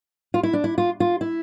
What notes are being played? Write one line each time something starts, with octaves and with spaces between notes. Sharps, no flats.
F4
E4
D4
E4
F4
F4
E4